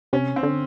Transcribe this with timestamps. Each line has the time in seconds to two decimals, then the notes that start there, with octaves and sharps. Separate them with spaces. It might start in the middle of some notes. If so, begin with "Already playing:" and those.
0.13 C3 C#4
0.36 C4
0.43 D3